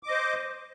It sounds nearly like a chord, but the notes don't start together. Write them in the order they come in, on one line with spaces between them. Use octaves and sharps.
D6 D#5 C5